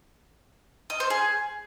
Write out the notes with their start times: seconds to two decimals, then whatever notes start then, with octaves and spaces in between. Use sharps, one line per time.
0.90 D#5
1.00 C5
1.10 G#4